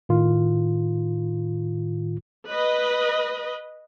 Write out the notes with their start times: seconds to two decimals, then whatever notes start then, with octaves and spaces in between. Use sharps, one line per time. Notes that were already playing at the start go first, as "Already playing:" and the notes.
0.09 A2 D#3 F4
2.47 B4 D#5